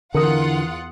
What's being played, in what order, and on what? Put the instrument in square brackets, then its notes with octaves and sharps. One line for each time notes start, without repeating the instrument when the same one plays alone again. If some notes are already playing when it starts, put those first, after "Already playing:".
[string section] E2 F4 F#5 [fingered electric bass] D3 [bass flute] E3 [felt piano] A#4 D#6